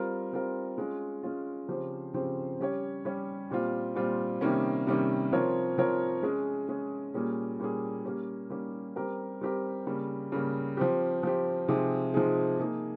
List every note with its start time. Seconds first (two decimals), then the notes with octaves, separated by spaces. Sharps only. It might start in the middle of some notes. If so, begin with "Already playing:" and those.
Already playing: G3 C4 F4 A#4
0.33 G3 C4 F4 A#4
0.78 G#3 C#4 F4
1.23 G#3 C#4 F4
1.68 C#3 F3 C4 G4 C5
2.14 C#3 F3 C4 G4 C5
2.60 G3 C#4 G4 C#5
3.05 G3 C#4 G4 C#5
3.50 A#2 G3 C4 F4
3.96 A#2 G3 C4 F4
4.41 C3 D#3 G3 A#3 C#4
4.87 C3 D#3 G3 A#3 C#4
5.32 F3 C4 F4 A#4 C#5
5.78 F3 C4 F4 A#4 C#5
6.23 G#3 C#4 G#4
6.68 G#3 C#4 G#4
7.14 A#2 G3 A#3 C#4 G#4
7.59 A#2 G3 A#3 C#4 G#4
8.05 G3 A#3 C#4 G4
8.50 G3 A#3 C#4 G4
8.96 G3 C4 G4 A#4
9.41 G3 C4 G4 A#4
9.86 C#3 G3 A#3
10.32 C#3 G3 A#3
10.77 F3 C4 G4
11.23 F3 C4 G4
11.68 C3 F3 G#3 D#4 G#4
12.14 C3 F3 G#3 D#4 G#4
12.59 A#3 D#4 G#4